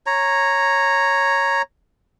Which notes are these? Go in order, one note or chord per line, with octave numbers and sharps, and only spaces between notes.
C#5 A#5